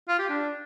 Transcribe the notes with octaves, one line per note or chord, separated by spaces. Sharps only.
F4
G4
D4